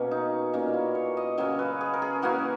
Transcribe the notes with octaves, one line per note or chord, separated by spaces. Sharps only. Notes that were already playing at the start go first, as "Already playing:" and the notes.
Already playing: B2 A#3 C#4
D#4
A#2 A#3 C#4 D#4
E4
C#5
D#5
C#3 F#3 C#4 C#5
B4
G#4
A#4
G#4
E3 A#3 C#4 F#4